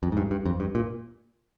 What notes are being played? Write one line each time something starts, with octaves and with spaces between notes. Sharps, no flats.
F2
G#2
G2
G2
F2
G2
A#2